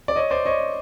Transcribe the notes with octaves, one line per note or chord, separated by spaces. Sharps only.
D5
C#5 D#5
C5 D5
C#5 D#5